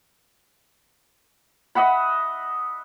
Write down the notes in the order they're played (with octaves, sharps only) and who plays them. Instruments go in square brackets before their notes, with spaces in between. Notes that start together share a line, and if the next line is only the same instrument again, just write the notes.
[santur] D#5 E5 F#5 B5